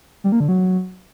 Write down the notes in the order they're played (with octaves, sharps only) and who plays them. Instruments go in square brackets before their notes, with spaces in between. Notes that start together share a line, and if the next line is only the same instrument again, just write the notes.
[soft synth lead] G3
A#3
D3
F#3